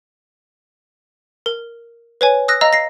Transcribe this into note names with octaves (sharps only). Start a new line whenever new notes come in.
A#4
B4 C#5 G#5
D#6 E6 F#6 A#6
D#5 F5 A#5 E6
A#6 C7